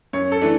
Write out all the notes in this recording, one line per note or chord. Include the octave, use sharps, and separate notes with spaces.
F#2 C#5
A4
E3 A3 D4